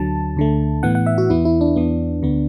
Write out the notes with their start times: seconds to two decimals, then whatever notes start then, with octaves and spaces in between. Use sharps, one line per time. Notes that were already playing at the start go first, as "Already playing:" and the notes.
Already playing: D2 D3 F#3 A5
0.37 D2 D3 A3
0.83 A2 E3 B3 F#5
0.95 F#5
1.06 E5
1.18 F#4
1.30 E2 E3 B3 E4
1.45 E4
1.61 D4
1.76 E2 E3 B3
2.23 D2 D3 B3